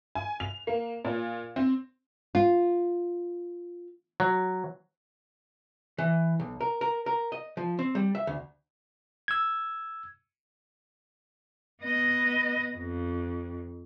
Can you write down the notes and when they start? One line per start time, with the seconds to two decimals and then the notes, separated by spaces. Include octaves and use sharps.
0.15 G#5
0.40 F7
0.67 A#3
1.05 A#2
1.56 C4
2.35 F4
4.20 F#3
5.98 E3
6.40 B1
6.61 A#4
6.81 A#4
7.06 A#4
7.32 D#5
7.57 F3
7.79 C4
7.95 G3
8.15 E5
8.27 D2
9.28 E6 G#6
11.83 B3 D#5
12.77 F2